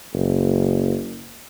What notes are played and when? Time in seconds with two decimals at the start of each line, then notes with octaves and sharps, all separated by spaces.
0.14 F#1